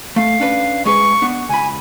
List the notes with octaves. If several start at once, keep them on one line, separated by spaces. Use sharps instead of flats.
A3 F5
C#4 D4 B4
G#3 G#4 B4 C#6
B3 D4
C#2 G#5 B5